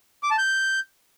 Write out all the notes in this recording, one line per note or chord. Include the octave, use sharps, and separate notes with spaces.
D6
A5
G6